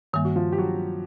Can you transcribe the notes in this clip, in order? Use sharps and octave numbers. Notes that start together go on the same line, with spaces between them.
G2 D#3 G3 A#3
F#4
F3 F4
G4
F#3 F#4